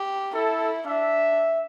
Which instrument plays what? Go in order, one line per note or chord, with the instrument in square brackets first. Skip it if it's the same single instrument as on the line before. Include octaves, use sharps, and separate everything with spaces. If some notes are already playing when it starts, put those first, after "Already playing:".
Already playing: [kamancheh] G4
[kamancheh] E4 [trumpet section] A4
[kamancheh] D4 [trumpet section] E5